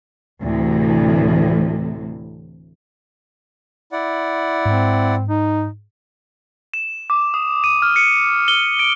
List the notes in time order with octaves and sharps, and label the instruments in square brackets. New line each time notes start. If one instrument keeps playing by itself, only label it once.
[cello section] D2 A2 C3 E3
[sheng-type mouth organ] E4 D5 F#5
[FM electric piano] G#2 [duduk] C4
[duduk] D#4
[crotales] E7
D6
D#6
D#7
F6
C#7
G7
D7